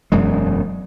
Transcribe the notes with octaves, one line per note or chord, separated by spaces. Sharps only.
E1 F#2 G#3